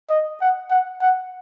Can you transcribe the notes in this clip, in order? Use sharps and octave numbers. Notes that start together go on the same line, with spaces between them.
D#5
F#5
F#5
F#5